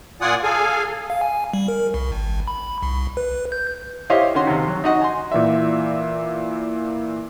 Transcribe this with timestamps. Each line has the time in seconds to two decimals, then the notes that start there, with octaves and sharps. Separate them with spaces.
0.21 A#2 F4 D5 F#5 G#5 D#6
0.43 G#4 A4 F5 G#5
1.10 F5
1.21 G#5
1.54 G3
1.68 A#4
1.94 C2
2.12 G#1
2.48 B5
2.83 C2
3.17 B4
3.52 G6
4.10 E4 G4 C5 C#5 D#5 F5
4.35 D#3 C#4 F#4 F#5 C6
4.47 D#2 C3
4.68 F#3
4.84 D#4 F#4 D#5 F#5
5.01 G#5 C6
5.32 A#2 E3 D5 E5